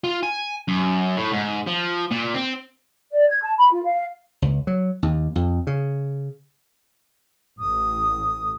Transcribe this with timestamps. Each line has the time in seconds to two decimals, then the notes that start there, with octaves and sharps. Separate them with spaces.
0.04 F4
0.23 G#5
0.68 F#2
1.17 A2
1.33 G#2
1.67 F3
2.11 A#2
2.34 C4
3.12 D5
3.29 G#6
3.42 A5
3.57 B5
3.71 F4
3.84 F5
4.42 C#2
4.67 F#3
5.03 D#2
5.35 F2
5.67 C#3
7.59 A1 D#6